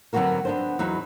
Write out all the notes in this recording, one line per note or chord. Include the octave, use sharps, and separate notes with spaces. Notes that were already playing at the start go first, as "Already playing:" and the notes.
D3 F#3 B3 C4 F#4 A#4
B3 D4 C5
E2 F#3 D#4 B4